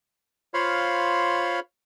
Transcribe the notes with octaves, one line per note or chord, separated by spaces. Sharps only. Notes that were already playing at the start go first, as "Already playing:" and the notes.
F4 C5 C#5 F5 B5